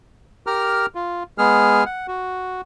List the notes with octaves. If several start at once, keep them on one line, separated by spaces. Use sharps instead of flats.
G4 A#4 A#5 F6
F4
G#3 B3 G#4 F6
F#5
F#4